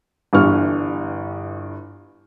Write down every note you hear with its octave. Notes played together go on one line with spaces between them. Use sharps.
G1 G2 E3 G#5 C#6 F6